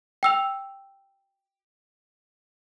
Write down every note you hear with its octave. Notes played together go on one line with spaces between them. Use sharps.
G5 E6 F7